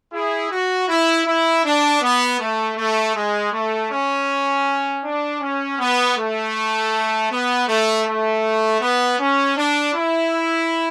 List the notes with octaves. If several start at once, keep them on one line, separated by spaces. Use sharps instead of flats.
E4 G#4
F#4
E4
E4
D4
B3
A3
A3
G#3
A3
C#4
D4
C#4
B3
A3
B3
A3
A3
B3
C#4
D4
E4